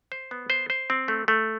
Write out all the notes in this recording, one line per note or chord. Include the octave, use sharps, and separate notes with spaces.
C5
B3
C5
C5
C4
A3
A3